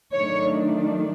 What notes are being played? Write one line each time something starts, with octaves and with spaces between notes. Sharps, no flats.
D#3 F#3 A3 D4 C#5